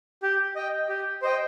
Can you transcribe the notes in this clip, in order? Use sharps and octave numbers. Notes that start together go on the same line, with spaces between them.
G4
D#5 G5
G4
C5 D#5 G5